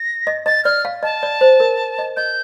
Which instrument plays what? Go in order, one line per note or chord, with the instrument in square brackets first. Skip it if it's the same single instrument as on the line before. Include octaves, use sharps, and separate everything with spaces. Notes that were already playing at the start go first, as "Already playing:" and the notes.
Already playing: [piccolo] A#6
[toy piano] D#5
[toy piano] D#5 [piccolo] A6
[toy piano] D5 [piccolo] F6
[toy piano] F5
[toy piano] D#5 [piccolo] A5
[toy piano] D5
C5
A#4
D#5
[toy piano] D#5 [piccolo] G6